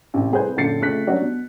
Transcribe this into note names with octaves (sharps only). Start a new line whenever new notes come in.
A1 C3
F1 C2 G#4 B4 C5 G6
A#1 F#2 D3 A6 C7 C#7
F2 C#3 A3 A4 F#6 B6
F#3 G3 C#4 D4 F#4 D5
B2